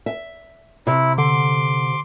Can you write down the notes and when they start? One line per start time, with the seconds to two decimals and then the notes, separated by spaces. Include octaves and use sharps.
0.06 E5
0.87 C3 E4
1.18 D3 C6 D6